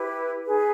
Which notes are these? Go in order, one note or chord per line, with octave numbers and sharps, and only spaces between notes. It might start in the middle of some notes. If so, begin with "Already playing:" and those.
Already playing: E4 G4 B4
D#4 G#4 B4